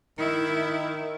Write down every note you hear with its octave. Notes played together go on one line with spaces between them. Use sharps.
D#3 E4